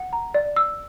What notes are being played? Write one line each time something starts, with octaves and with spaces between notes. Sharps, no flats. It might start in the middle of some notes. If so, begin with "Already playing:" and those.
Already playing: F#5
A#5
D5
E6